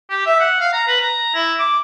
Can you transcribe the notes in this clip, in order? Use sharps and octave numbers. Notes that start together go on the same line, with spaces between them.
G4
E5
F#5
F5
A#5
B4
A#5
E4
D6